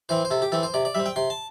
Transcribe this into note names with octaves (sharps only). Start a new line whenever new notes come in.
E3 C4 C5
C5
C3 A4
G4
E3 C4 A4
C5
C3 D5
D5
G3 C4 E5
G5
C3 C6
A5